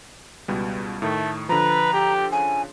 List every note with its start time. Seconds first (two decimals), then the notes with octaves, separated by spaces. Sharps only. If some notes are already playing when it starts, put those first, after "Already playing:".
0.48 C#2 B2 G3
1.02 A2 D#3 A3
1.49 D3 F3 B4 A#5
1.93 G4
2.32 C#3 G#5